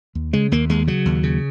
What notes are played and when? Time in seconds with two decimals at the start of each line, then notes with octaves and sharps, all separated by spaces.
0.15 D#2
0.33 C#3 G#3
0.51 D#2 A#3
0.69 D#2 G#3
0.87 C#3 F#3
1.05 D#2
1.23 C#3